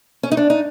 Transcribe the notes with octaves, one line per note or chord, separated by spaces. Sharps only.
C#4
D#4
D4
D#4